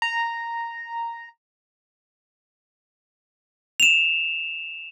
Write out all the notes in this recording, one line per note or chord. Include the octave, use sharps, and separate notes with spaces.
A#5
E7 F7